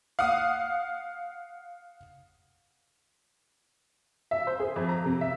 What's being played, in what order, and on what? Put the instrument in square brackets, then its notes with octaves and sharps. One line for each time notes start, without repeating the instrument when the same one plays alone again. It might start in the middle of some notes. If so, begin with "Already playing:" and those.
[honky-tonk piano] F5 F#5 D#6
E5
C5
G#4
F2
A#5
C3
E5